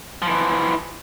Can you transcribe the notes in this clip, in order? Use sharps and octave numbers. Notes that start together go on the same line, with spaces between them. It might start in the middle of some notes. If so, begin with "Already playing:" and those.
E3 F3